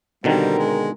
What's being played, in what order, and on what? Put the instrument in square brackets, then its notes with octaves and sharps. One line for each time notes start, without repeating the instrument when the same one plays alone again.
[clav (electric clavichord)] B2 D3 D#3 [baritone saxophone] G3 [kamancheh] C4 A#4
[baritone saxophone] G#3